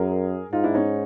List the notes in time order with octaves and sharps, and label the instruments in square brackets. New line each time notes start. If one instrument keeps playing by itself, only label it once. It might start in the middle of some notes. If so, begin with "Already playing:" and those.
Already playing: [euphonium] F#2 [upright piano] G#4 A#4
[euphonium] G#2 [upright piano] D#4 F4
[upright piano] D4 E4
C#4 D#4